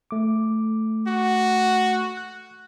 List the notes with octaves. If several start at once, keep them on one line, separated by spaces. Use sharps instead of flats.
A3 D6
F#4
F#6